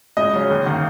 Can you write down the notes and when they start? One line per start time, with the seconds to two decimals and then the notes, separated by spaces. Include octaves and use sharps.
0.17 C#2 D#5
0.34 C#3 F#3 C#4
0.50 D#2
0.66 D#3 A#3